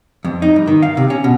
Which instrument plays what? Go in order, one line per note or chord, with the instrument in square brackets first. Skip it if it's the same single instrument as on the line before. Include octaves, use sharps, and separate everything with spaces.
[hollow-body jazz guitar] F2
D#4
G2
D#3
F5
C3
C#4
B2